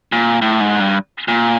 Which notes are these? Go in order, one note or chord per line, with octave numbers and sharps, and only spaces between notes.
A#2
A2
G#2
G2
A#2